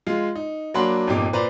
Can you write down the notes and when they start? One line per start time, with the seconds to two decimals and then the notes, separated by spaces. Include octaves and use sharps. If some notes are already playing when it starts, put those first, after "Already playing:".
0.07 G#3 F4
0.35 D#4
0.74 F#3 A#3 D4 F#5 B5 C6
1.08 G1 F2 A#2 D#4 G4 D6
1.33 A#2 B4 C5 D5 A#5